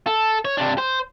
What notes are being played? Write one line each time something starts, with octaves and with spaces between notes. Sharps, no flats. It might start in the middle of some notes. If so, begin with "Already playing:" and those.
A4
C#5
C3 D4
C5